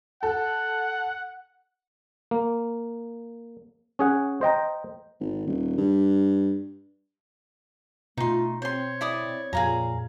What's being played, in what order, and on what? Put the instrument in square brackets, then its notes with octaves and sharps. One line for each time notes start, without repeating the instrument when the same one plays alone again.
[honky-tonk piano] A4 [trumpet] F#5
[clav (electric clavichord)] A#3
C#4 G#4 F#5
C5 D#5 G5 A#5
[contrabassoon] G#1
D#1
G2
[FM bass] B2 [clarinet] A3 [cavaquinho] D#4 C6 [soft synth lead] F4
[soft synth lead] C4 [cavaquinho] C5 C6 [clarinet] C#5
[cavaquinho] E4 D5 D#6
[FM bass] F2 [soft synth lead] A#2 [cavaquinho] G#4 F5 A#5